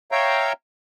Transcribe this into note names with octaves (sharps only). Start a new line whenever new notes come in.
C#5 E5 F5 G5 A#5